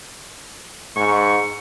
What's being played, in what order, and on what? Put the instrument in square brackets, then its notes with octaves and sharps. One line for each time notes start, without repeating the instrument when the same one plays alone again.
[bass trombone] G#2 [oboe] C#6